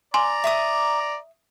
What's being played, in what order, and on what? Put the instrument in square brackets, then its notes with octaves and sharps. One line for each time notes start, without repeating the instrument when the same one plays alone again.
[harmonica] D5 A#5 [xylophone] G#5 C6
[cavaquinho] E5 C#6 D#6